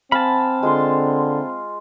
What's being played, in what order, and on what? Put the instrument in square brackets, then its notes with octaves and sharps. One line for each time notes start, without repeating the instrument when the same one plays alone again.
[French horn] C4 [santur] F5 G#5 [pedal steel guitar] A5 B5
[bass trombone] D3 [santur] G#3 F4 C6